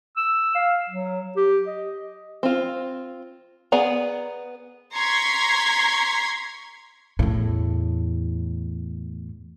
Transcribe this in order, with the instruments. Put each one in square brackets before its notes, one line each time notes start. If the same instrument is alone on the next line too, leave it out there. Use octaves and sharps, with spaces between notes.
[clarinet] E6
F5
F#3
G4
D#5
[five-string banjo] C4 F4
B3 G#4 D5 F#5 A#5
[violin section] A#5 C6 C#6 G#6 B6 C7
[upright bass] E2 A2